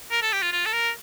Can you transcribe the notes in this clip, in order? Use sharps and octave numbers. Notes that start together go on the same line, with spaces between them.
A#4
A4
G4
F4
F4
A4
A#4